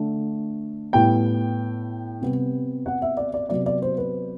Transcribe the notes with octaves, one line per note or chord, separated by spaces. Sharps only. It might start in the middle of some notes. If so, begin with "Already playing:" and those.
Already playing: D3 A3
A2 G3 B3 G5
C3 G3 B3
F#5
E5
D5
D5
C3 F#3 B3 D5
D5
C5
B4